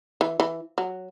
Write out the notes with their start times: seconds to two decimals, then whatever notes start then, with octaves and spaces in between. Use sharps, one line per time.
0.21 E3
0.40 E3
0.78 F#3